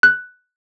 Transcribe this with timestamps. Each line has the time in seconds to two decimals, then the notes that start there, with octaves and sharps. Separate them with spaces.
0.03 F#6